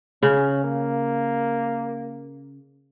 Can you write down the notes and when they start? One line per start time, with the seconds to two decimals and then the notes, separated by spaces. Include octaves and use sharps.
0.23 C#3 C#4
0.64 A#3